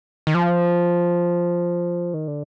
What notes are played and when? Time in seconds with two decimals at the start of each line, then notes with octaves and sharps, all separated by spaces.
0.27 D#3
0.34 F3
2.14 D#3
2.28 D3